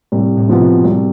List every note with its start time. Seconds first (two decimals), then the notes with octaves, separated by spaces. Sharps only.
0.12 C2 A2
0.37 A2
0.49 C3 F3 B3
0.61 B2
0.84 C2